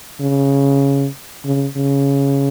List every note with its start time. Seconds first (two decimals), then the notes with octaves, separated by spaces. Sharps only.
0.20 C#3
1.45 C#3
1.76 C#3